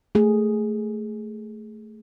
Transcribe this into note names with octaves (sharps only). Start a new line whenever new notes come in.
A3 G#4